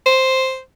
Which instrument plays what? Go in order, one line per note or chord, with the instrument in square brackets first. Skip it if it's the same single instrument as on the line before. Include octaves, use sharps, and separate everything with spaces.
[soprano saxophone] C5